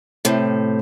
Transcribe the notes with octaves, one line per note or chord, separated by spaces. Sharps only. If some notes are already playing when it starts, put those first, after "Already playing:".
A2 C3